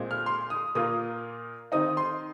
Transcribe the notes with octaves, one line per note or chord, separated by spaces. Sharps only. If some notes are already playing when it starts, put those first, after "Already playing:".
Already playing: A#2 G#3 C4
F6
C6
D#6
A#2 A#3 F4 D#6
D#3 C4 D#4 D#6
C6